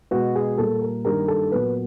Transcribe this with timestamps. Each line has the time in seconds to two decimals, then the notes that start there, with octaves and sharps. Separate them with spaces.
0.11 B2 G#3 B3 F#4
0.35 G#4
0.57 A#2 G3 A#3 A4
0.81 A#4
1.05 G2 D#3 G3 A#3 A#4
1.28 A4
1.51 A#2 F#3 B3 B4